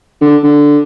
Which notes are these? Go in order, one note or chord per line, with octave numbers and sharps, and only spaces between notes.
D3
D3